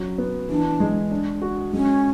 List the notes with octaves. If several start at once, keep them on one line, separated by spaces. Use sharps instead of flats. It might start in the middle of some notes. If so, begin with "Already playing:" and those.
Already playing: F#3 C#4
B3
E3 D4
G#3
D4
F#4
G#3 C#4